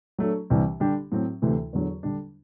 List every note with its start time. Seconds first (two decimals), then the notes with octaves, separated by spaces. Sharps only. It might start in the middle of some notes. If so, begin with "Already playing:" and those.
0.18 F#3 A3 D4 A4
0.50 C2 C3 E3 G3 D4
0.80 D3 G3 D4 G4
1.12 A2 F#3 C4
1.42 D2 C3 E3 A3 E4
1.73 E2 D3 F#3
2.03 D3 G3 D4